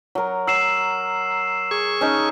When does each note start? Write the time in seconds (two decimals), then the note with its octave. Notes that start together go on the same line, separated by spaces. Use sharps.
0.15 F#3 A#4
0.47 F#3 E6 C7 E7
1.71 G#4 C#6
2.01 C#4 D#4 A5